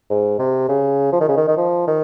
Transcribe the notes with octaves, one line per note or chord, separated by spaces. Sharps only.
G#2
C3
C#3
F3
D#3
C#3
D#3
D#3
F3
D#3